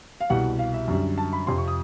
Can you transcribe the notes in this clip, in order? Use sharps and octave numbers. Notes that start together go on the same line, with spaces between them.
F5
C2 B2 G3 F#5
F5
E5
F#2 D3 G3
A5
B5
F2 C3 F3 C6
C#6
D#6